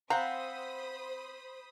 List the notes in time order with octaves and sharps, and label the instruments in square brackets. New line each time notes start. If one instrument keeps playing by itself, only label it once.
[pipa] C4 [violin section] C5 B5 D#6 [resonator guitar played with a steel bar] F5 F#5 [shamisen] A#5